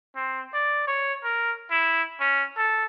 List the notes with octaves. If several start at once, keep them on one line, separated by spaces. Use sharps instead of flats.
C4
D5
C#5
A#4
E4
C#4
A4